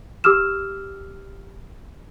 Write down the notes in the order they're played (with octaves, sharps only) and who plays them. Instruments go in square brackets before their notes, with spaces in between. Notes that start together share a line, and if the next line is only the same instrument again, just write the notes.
[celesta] G4 D6 E6 F6 E7